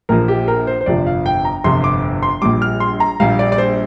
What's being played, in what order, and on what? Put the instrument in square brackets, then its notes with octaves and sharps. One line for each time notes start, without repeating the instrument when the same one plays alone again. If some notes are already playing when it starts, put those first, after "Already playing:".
[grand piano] A#1 A#2 F3 A#4
G4
A#4
C5
C5
G1 F2 C3 F3 D5
F5
G5
A#5
G1 F2 C3 F3 C6
D6
C6
A#1 A#2 G3 D6
F6
C6
A#5
A#1 A#2 G3 F5
D5
D5
C5